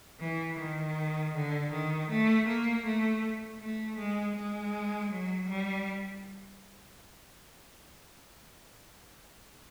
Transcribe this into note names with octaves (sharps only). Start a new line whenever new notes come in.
E3
D#3
D3
D#3
A3
A#3
A3
A3
G#3
G#3
F#3
G3